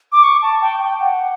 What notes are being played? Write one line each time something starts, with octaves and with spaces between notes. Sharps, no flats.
D6
C#6
A5
G5
G5
F#5